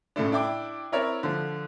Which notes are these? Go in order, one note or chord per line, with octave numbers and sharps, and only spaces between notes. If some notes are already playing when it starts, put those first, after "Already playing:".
A2 C#3 A3 D4
D4 E4 G5 D6
C4 E4 A#4 C#5 D5
D3 F3